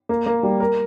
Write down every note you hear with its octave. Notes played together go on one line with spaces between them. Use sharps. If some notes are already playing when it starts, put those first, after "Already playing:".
A#3
A#3
G3
A#4